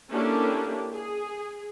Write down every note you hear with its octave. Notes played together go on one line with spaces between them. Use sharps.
A#3 C#4 D4 E4 G4 A4
G#4